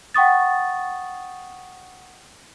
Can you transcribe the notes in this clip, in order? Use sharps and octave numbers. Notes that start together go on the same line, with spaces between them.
F#5 G5 C#6 D#6 A6